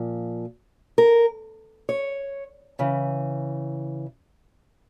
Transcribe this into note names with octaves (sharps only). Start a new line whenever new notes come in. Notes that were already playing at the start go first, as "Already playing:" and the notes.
Already playing: A#2 F3
A#4
C#5
C#3 E3